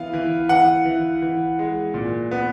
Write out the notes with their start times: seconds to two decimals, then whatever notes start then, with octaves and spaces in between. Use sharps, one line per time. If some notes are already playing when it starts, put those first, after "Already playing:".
Already playing: E3 B3 F5
0.13 E3
0.49 E3 F#5
0.85 E3
1.22 E3
1.59 G#3
1.94 A#2
2.31 B3